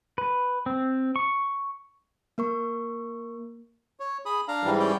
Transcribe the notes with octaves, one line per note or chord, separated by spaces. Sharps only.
B4
C4
C#6
A#3 A#4 C#6
C#5
G#4 B5 D#6
D4 F5 A#5
G#2 E3 G3
C#4 D5 G5